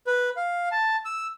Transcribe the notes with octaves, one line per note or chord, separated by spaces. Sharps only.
B4
F5
A5
E6